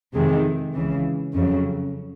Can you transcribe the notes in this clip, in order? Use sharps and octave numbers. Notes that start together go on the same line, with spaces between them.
F2 C3 D#3 G#3
C#2 C#3 E3
F2 C#3 F#3